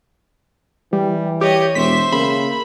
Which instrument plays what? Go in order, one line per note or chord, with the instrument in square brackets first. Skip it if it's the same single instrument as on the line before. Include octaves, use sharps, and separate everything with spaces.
[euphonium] E3 [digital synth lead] G3
[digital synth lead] G4 [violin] C#5 D#5
[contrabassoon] E1 [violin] C5 E5 [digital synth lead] B6
[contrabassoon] C#3 [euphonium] A#3 [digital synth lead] B5